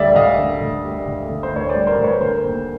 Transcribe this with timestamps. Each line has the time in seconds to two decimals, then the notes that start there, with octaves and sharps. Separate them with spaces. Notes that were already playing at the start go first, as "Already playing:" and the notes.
Already playing: D2 D3 G3 D5 E5
0.16 D2 D#5 F5
0.39 D3
0.61 D2
0.84 G3
1.07 D2
1.30 D3
1.43 C5
1.52 D2 C#5
1.69 C5 D5
1.75 G3
1.87 A#4 C5
1.98 D2
2.04 B4 C#5
2.21 D3 A#4 C5
2.44 D#2